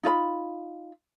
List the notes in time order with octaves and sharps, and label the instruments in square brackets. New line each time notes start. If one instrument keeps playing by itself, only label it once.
[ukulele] D#4 F4 D5 B5